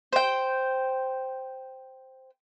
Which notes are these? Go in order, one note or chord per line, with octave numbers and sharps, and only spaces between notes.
C5 G5